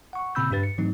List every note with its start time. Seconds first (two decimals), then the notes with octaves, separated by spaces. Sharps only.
0.13 F#5 C#6
0.35 A#2 C#3 C4 B5 E6 G6
0.51 G2 D4 G4 B4 A6
0.63 C#7
0.78 G#2 E3 F#3 A3 C4 D#4